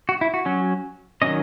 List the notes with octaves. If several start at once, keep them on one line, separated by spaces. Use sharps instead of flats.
F#4
E4
F#4
F#3 C#4
D#3 F#3 C#4 D#5